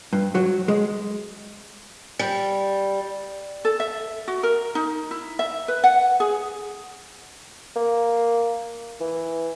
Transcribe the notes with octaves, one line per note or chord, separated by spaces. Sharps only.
G2
F#3
G#3
G3
A4
E5
F#4
A#4
D#4
E4
E5
B4
F#5
G#4
A#3
E3